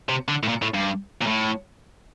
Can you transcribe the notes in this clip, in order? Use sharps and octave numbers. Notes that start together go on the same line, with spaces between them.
C3
D3
A2
A#2
A2
G2
A#2
A2